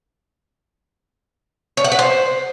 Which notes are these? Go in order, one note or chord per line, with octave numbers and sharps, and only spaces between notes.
C#5
F#5
B4
C5